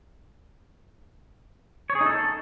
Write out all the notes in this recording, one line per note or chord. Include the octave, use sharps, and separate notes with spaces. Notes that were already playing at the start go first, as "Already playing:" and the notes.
C#5
G#4
D#4
A4